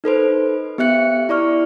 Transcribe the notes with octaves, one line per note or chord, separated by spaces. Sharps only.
D#4 A4 B4 C5
B3 G4 E5 F#6 C#7
E4 D5 C#6 F6